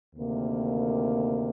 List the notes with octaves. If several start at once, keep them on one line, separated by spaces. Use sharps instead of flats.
D2 C3 D#3 A#3